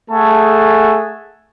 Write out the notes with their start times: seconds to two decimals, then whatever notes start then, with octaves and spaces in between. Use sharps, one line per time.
0.10 A3 G#4 A4 F#5 G#5 A5